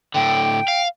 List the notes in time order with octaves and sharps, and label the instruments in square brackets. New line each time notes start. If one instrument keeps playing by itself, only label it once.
[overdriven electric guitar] A2 D3 [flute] G5
[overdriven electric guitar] F5